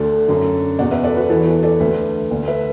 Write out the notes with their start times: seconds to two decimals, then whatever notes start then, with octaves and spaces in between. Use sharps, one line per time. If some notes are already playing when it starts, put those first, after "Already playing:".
Already playing: D2 D3 A4 D5
0.28 F#2 D3
0.79 E2 B2 D5 F#5
0.91 B4 E5
1.04 A4 D5
1.17 F#4 B4
1.29 E2 E3 E4 A4
1.47 F#4 B4
1.63 A4 D5
1.80 D2 D3 B4 E5
2.31 D2 D3
2.48 B4 E5